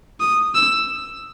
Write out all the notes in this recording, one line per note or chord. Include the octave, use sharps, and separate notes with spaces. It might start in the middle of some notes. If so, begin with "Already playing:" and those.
D#6
E6